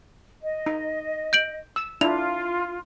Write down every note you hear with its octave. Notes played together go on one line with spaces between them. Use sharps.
D#5
D#4
G6 D7 F#7
E6
D4 E4 F4 F7